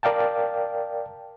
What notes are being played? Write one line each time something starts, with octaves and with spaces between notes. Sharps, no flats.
A#4 D5 F5 G5 A5